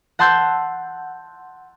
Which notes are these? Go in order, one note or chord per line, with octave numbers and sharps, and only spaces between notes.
F#5 A5 C6 E6 G6